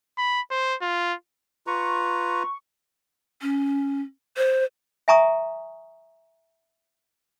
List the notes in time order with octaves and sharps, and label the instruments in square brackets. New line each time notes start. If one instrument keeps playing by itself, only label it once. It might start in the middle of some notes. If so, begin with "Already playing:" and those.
[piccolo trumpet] B5
C5
F4
[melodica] F4 B4 A#5 [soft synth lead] C#6
[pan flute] C#4
C5
[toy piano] E5 G#5 A#5 C#6 D#6